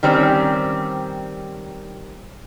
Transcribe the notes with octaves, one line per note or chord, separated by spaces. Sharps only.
D#3 G3 C4 C#4